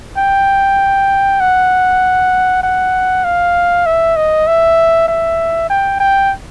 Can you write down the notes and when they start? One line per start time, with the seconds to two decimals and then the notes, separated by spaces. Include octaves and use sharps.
0.17 G5
1.40 F#5
2.63 F#5
3.24 F5
3.86 E5
4.16 D#5
4.47 E5
5.08 E5
5.70 G5
6.00 G5